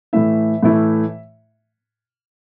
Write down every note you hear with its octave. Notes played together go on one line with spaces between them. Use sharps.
A2 E3 A3 E4 E5
A2 E3 A3 E4